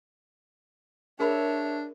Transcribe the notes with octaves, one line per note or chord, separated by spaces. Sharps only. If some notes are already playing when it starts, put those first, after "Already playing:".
D4 G#4 A#4 C#5 E5 B5